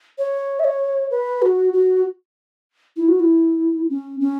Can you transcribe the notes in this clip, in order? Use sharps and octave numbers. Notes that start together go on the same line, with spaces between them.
C#5
E5
C#5
B4
F#4
F#4
E4
F#4
E4
C#4
C#4